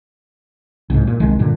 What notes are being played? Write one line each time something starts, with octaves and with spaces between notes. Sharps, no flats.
C2 G#2
A#2
E1 C2 D#3 G#3
G2 A#2 D3